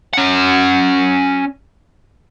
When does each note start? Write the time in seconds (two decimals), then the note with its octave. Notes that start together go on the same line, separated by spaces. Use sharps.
0.14 C#4 F#5